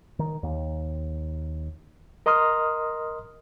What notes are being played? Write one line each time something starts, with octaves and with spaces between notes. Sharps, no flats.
D#3
D#2
A#4 D#5 A#5 C6 D#6 F6